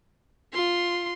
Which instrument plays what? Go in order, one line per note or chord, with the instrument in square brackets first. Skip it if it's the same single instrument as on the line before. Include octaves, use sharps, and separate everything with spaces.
[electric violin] F4 C6